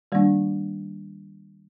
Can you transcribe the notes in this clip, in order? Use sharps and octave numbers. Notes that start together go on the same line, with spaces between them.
D#3 G3 A#3 D4